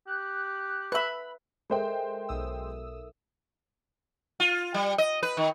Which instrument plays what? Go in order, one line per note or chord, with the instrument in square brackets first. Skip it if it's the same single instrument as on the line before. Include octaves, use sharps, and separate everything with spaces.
[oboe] G4 [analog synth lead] F#6
[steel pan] B4 E5 [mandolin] B5 F#6
[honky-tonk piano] G#3 C5 G5 [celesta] A4 A#4 E5
[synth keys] B1 D#6 E6
[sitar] F4
G3
D#5
B4
D#3